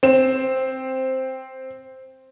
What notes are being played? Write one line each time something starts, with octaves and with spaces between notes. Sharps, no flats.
C4 E7